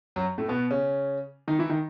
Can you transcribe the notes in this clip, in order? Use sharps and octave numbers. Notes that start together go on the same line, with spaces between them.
F#2 F#3
A2 A3
B2 B3
C#3 C#4
D#3 D#4
E3 E4
D#3 D#4